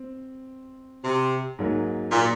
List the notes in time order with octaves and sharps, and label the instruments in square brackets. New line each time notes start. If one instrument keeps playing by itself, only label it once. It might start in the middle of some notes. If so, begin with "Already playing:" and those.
Already playing: [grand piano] C4
[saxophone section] C3
[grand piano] G#2 F#3 A#3
[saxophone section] A#2